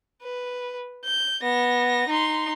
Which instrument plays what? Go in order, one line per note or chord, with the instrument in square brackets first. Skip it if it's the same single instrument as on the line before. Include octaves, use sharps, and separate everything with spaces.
[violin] B4
G6
B3 A#6
D#4 C6